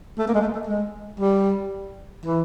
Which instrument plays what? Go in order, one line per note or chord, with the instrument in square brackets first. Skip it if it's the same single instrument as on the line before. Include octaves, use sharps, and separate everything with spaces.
[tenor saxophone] A3
A#3
G#3
A3
A3
G#3
G3
E3